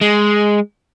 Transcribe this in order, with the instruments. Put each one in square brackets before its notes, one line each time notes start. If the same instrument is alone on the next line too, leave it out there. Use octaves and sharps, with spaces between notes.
[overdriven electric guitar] G#3